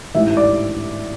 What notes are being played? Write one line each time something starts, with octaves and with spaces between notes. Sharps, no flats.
A1 G#2 E3 E5
D5